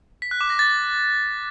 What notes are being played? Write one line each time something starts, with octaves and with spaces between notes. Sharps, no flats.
B6
F#6
D6
A#6
A6